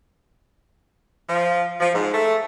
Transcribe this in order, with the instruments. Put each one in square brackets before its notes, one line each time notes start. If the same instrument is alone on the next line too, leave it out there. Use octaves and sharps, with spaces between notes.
[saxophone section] F3
F3
G#2
A3